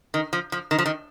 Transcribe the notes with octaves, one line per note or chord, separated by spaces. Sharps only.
D#3
F3
F3
D#3
F3
D#3